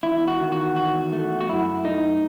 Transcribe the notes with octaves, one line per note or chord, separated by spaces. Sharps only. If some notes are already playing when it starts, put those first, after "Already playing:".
E2 E4
F#4
D#3
F#4
E2 F#4
A3
F#4
F#2 E4
A3 D#4